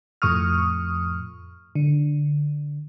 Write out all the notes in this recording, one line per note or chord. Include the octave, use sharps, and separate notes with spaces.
F2 A2 C#6 D#6 F6
D3